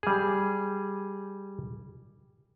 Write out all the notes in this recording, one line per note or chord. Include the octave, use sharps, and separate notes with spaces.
G3 G#4